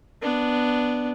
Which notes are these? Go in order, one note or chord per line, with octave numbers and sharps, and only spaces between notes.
B3 D4